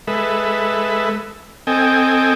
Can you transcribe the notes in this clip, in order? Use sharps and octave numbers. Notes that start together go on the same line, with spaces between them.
G#3 A4 B4 E5
C4 A4 D#5 G5 G#5